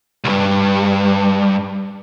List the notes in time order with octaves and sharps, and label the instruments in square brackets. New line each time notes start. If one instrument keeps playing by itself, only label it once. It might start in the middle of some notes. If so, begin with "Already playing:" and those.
[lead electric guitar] C2 G2